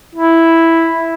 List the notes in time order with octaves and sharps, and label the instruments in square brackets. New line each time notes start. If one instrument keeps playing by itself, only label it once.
[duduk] E4